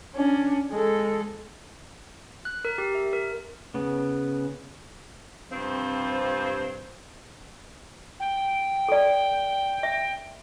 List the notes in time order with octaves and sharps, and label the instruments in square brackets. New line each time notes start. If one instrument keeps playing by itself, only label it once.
[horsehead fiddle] C#4 D4
G#3 A4
[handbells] F#6
A#4
G4
E5
A#4
[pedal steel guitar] C#3 B3
[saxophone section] G2 C3 F3 C4 C5
[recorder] G5
[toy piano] A4 D5
E5